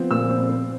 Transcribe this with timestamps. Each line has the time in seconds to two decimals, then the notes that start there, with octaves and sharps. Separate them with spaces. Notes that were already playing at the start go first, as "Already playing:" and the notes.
Already playing: F3 B3 C4
0.11 A#2 E6
0.30 C4
0.49 C4